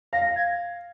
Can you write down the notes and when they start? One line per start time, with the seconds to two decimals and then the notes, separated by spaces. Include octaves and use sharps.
0.13 F5 A#6
0.35 G#6